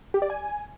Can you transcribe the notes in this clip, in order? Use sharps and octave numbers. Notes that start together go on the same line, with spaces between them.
G4
D5
G#5